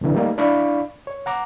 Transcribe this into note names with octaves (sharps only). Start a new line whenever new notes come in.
C2 A#2 D3 E3
G3 A3 A#3 D#4
D4 E4 D5 F5 B5 C#6
C#5
F#5 A#5 D6